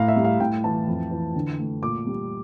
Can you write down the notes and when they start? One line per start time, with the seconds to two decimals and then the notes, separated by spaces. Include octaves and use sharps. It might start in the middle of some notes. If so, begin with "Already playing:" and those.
Already playing: A2 F5 A#5
0.08 E5
0.16 G3
0.24 F5
0.40 A2 G5
0.64 E3 A5
0.87 F2
1.11 E3
1.35 D3
1.59 A3
1.82 A#2 D6
2.07 G3